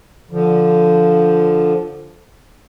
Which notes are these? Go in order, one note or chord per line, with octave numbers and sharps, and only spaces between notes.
D3 F3